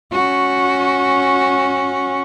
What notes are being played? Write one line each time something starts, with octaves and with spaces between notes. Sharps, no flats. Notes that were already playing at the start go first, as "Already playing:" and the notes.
C#4 F#4